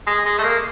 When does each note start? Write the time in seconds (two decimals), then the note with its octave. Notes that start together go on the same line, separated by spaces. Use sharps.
0.07 G#3
0.25 G#3
0.38 A3
0.44 A#3